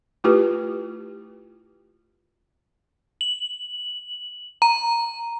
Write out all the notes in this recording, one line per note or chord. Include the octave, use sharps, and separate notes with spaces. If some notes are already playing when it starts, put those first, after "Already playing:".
A3 E4 F4 G4 B4
F#7
A#5